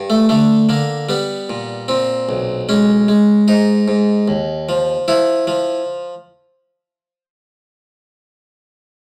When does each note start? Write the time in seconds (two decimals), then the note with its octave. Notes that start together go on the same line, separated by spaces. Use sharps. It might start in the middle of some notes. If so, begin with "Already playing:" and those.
Already playing: G2
0.10 A3
0.29 D3 A3
0.69 D3 A#3
1.09 G3 B3
1.49 A#2
1.88 A#2 C4
2.29 B1
2.69 G#3 C#4
3.08 G#3
3.48 G#2 D#4
3.88 G#2
4.28 D#2
4.69 F3
5.08 F3 E4
5.47 F3